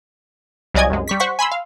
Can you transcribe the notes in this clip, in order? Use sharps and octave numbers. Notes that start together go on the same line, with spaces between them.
C2 F#3 D5 D#5 G#5 G#6
C2 F#2 G#3
G3 C#6 B6
C5 F#5 C#6 B6
G#5 B5 C6 E6
F5